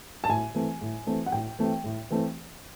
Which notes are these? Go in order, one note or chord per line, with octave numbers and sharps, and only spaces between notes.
A5
A2 G#5
E3 A3 C4
A2
E3 A3 C4
F#5
A2 G5
E3 A3 C4
A2
E3 A3 C4